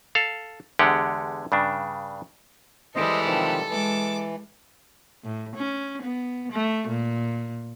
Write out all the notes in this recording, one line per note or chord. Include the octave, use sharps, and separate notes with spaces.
A4 F5
E2 D3 G#3 G4 F#5
G2 C#3 D4
E3 G3 G#3 A4 C5 D#5
C3 D#3 F3
E3 G#3 D6
A2
C#4
B3
A3
A#2